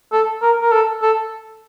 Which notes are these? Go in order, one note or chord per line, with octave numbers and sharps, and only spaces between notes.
A4
A#4
A#4
A4
A4